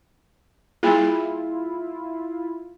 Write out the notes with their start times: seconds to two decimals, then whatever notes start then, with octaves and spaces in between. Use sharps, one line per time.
0.83 G3 A#3 E4 F4 G#4